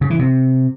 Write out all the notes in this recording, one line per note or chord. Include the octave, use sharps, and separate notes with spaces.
C#3
E3
C3